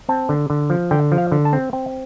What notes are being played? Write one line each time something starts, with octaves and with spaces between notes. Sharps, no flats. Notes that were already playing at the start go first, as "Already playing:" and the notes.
C4 A5
D3
D3
F3
D3 G5
F3
F5
D3
A5
C4
C4 G5